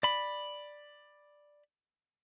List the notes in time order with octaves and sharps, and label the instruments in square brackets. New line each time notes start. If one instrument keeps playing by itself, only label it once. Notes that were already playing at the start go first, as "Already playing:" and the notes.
[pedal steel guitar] D5 B5